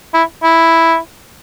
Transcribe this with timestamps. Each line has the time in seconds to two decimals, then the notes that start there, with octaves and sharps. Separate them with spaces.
0.14 E4
0.43 E4